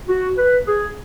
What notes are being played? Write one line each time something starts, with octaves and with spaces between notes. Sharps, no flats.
F#4
B4
G#4